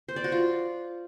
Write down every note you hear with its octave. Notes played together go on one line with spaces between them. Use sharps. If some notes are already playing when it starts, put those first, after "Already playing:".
C5
D5
F#4
F4